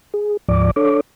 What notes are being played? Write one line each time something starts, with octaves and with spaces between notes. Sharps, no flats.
G#4
D2 G#2 F3 D5 D6
D4 A4 C#5 D6